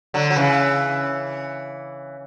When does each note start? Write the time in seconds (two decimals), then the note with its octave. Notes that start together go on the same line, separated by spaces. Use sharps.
0.14 D3 F#3
0.30 F#3
0.36 C#3 E3